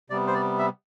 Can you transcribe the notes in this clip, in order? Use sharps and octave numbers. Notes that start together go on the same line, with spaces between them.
C3 G3 B3 D5
C5
D5
E5